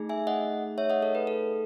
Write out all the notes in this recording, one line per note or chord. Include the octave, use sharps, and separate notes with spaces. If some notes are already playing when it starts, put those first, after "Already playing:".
Already playing: A3 D#4 G#4
E5 G#5
D#5 F#5
C#5 E5
D#5 F#5
A4
B4
A4